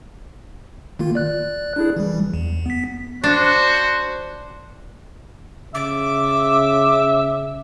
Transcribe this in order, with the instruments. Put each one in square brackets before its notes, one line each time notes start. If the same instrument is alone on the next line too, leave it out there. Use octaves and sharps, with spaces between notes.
[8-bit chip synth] D#3 A#3 F4
D5 F#6
D4 E4 G#4
E3 G3
E2
B3 B6
[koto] D4 [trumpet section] F#4 [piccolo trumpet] C5
[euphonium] C#3 [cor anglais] E5 [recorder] D6